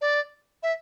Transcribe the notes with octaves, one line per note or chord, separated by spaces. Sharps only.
D5
E5